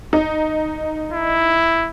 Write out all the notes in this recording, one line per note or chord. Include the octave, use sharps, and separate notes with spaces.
D#4
E4